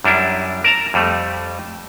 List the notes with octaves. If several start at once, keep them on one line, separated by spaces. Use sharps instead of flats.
F#2 G3 D4 E4
A#4 A5 A#5
F2 G3 A3